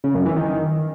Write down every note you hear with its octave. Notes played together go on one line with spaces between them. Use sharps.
C#3
F#2
E3
D#3